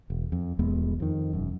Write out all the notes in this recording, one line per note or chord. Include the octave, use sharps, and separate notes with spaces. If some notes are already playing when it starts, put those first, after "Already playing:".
E1
F2
D#1 E2 G#3 B3
F2 D#3
E1 F#2